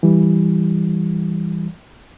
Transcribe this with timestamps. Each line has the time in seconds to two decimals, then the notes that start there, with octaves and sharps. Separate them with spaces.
0.03 E3 G3